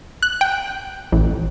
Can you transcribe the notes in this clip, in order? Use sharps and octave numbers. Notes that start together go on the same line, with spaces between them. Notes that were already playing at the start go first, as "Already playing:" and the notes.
F#6
G5
A1